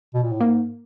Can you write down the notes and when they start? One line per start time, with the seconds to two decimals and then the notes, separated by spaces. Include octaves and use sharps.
0.14 B2
0.23 A#2
0.32 A2
0.40 G#2 A#3